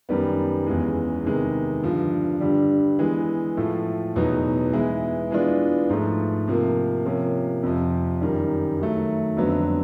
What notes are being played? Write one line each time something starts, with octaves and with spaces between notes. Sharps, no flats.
F#2 D#3 G3 B3
E2 C#3 E3 G#3
C3 D#3 G#3 B3
G2 D3 F3
G2 D3 G3
E3 G#3 B3
A2 F3 A3
E2 B2 F#3 B3 D#4
E3 G#3 B3 E4
E3 G#3 B3 D4 F4
G#2 F3 A3
C3 F3 A#3
C3 F3 A#3 C#4
F2 C3 F3
F#2 D#3 G3
D#3 F#3 A3
F2 D3 F#3 B3